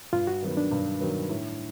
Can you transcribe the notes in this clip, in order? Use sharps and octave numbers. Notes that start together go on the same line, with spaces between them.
G2 F4
F#4
D#3 F#3 B3
D4
G2
D#3 F#3 B3
A2